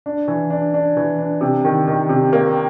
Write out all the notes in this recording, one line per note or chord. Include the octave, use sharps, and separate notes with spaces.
D4
E3
D4
D4
E3
D4
C3
D#3
D#3
C3
A#3